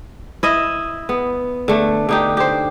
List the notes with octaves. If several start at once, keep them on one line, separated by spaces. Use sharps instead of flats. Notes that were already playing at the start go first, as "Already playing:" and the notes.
E4 D#5 E5
B3
D3 A3
D3 D#4 G4
G4 C5